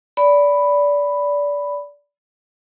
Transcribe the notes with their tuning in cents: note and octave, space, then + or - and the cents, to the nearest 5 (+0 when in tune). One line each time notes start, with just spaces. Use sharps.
D5 -20 B5 +0